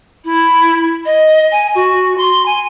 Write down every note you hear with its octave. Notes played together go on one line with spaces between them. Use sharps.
E4
D#5
G#5
F#4
C6
G#5